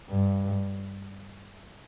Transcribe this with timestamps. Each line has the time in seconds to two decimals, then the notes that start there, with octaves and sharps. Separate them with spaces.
0.09 G2